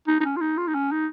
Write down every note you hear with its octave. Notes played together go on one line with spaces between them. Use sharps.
D#4
D#4
C#4
F4
D#4
F4
D#4
C#4
D#4